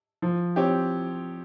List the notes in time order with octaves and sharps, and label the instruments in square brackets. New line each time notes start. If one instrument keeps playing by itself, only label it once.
[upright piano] F3
C4 G4 C#5